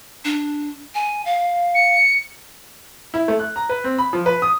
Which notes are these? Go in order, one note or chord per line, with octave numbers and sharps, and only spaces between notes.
D4
G#5
F5
C#7
E4
A3
F#6
A#5
B4
C4
B5
F3
B4
D#6